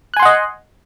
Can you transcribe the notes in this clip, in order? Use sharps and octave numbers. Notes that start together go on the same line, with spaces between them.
D#5 F#5 G#5 C6 F#6